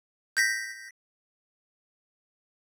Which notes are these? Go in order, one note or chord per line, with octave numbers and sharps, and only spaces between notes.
G6 A#6 B6